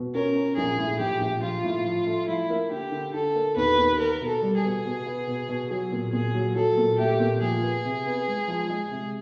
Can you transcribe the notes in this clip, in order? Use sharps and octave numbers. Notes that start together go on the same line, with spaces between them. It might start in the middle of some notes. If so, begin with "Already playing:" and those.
Already playing: B2
C#4 A#4
C#4
A#1 G#4
A2
A#1 G4
A#1
F3 F4
A2
F3
A3
F3 E4
A#3
D3 G4
D3
D3 A4
A#3
D#2 B4
D#2
B3 A#4
B2
A4
G3
G#4
B2
B2
B3
B2
B2
F#3 G#4
A#2
A#2 G#4
F#3
F#3 A4
A#2
A3 G4
A#2
F3 G#4
B3
C3
B3
G#3
F3
G#3
C3